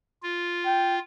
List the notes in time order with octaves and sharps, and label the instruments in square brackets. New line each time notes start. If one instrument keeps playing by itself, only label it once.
[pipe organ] F4
[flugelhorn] G5